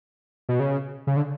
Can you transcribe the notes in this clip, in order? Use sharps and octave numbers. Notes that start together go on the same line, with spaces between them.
B2
C#3
C#3
D3